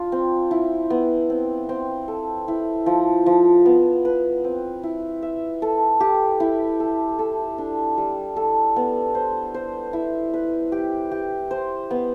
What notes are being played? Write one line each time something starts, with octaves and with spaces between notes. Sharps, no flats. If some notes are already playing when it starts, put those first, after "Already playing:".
Already playing: D4 F4
C4
E4
B3
C4
C4
A4
E4
F3
F3
B3
B4
C4
E4
E5
A4
G4
E4
A4
A4
D4
G3
A4
B3
C5
C5
E4
B4
G4
G4
C5
B3